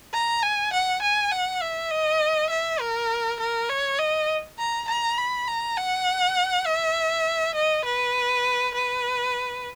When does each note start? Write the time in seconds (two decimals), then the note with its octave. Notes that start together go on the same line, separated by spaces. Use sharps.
0.13 A#5
0.42 G#5
0.73 F#5
1.02 G#5
1.31 F#5
1.62 E5
1.91 D#5
2.50 E5
2.80 A#4
3.40 A#4
3.69 C#5
3.98 D#5
4.59 A#5
4.88 A#5
5.18 B5
5.48 A#5
5.76 F#5
6.65 E5
7.55 D#5
7.85 B4
8.74 B4